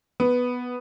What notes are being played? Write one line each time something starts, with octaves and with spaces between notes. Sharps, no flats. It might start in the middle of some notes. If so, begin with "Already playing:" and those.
B3